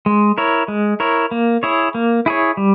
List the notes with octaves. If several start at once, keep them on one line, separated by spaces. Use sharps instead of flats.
G#3
E4 A#4 C#5
G#3
E4 A#4 C#5
A#3
E4 G#4 C#5
A#3
E4 G#4 C#5
G3